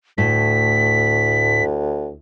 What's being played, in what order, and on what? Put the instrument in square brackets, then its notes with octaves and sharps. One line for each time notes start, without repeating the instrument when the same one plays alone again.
[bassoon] D2 [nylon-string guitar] A2 [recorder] B6